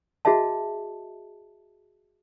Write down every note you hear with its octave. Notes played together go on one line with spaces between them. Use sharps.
F#4 G#4 D#5 E5 A5